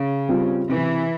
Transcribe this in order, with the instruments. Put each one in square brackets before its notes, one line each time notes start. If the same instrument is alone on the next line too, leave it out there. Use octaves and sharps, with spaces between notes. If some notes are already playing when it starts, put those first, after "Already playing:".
Already playing: [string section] C#3
[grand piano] G3 C4 F4
[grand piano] C3 [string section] E3